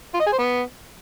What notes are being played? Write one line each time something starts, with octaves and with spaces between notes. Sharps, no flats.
F4
D#5
G#4
C5
B3